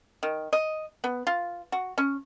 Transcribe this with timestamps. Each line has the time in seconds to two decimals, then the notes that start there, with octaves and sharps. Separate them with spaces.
0.23 D#3
0.53 D#5
1.04 B3
1.27 F4
1.72 F#4
1.98 C#4